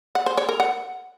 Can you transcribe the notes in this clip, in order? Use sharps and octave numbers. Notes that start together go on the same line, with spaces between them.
F#5
C5
C#5
A#4
F#5